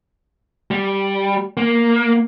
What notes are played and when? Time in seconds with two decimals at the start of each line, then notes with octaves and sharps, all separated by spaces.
0.71 G3
1.57 A#3